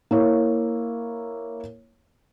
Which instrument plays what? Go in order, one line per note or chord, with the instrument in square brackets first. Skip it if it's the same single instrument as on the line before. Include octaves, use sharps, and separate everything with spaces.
[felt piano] A#3 E4 C#5